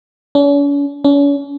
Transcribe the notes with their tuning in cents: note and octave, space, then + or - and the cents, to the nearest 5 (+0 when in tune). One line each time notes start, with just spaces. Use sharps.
C#4 +45
C#4 +40